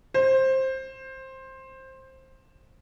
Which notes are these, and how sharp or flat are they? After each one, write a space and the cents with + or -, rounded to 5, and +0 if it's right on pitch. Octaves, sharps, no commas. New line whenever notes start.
C5 +15